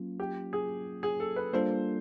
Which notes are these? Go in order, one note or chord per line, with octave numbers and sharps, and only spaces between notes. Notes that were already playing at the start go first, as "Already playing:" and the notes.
Already playing: F#3 A#3 C#4 F4
G4
G#4
G#4
A4
B4
G3 A#3 D4 F4 A4 C5